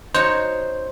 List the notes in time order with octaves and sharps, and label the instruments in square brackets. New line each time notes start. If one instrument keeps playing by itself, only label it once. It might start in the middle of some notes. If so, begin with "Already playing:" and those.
[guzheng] D#4 F#4 C#5 [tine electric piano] C5